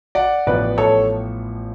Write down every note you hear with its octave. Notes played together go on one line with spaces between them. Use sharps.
D5 F#5
A1 A2 F3 B3 B4 D5
A4 C#5